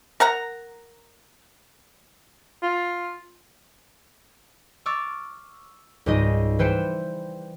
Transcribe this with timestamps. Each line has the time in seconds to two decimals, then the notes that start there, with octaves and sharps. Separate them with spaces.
0.20 A#4 F#5 A#5
2.63 F4
4.86 C#6 D6 E6 F6 A6
6.06 C#2 G#2 G3 D#4 D#5
6.59 E3 B4 C5 G5 C#7 E7